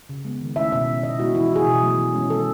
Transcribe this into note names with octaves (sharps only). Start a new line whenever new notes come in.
C#3
G#3 B3
D#3
A3 C#4 E4 E5
B2 E5
F#3 C#4
B2 D#5
G#3 B3 E4 F#4
E3 E4
F#4
A3 E4 G#4
B2
F#3 A3
E3
G#3 C#4 E4
D#3 A4